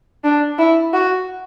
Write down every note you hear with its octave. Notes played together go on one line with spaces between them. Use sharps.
D4
E4
F#4